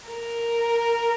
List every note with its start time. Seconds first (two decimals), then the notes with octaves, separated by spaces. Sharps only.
0.08 A#4